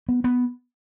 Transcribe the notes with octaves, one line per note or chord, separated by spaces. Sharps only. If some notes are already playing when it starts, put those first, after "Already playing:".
B3
B3